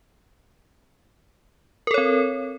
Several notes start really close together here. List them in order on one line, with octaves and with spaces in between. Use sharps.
A#4 A4 C#5 C4